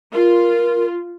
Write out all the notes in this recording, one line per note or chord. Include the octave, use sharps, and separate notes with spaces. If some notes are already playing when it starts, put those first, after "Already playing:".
F4 A#4